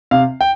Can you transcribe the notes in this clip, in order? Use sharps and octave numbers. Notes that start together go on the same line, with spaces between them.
C3 F5
G5